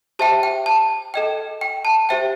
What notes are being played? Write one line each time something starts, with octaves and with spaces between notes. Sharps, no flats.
G4 C5 E5 G5 A5
G5
A5
A4 D#5 G5
G5
A5
G4 C5 E5 G5